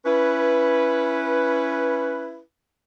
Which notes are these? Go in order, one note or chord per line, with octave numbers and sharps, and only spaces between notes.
C#4 E4 B4